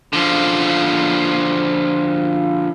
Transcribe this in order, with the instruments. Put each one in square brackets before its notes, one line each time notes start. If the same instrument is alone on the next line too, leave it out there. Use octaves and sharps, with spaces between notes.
[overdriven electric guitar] D3 F3